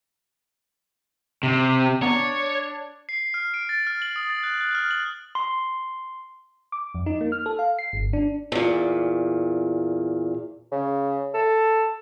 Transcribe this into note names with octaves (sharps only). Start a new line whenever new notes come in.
C3
B3 D4 C#5 A#5
C7
F6
D7
A6
F6
F#7
D#6
A6
F#6
F#6
F6
F#7
C6
D6
F2
D#4
A#3
F6
A4
F5
C7
G1
D4
E2 A#2
C#3
A4